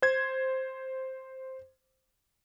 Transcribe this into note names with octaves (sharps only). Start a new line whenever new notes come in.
C5 G#6